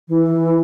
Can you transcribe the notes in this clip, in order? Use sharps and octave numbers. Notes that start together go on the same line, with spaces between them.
E3